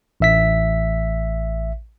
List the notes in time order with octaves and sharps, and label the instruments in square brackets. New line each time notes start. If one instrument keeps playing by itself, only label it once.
[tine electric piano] A1 E5 B6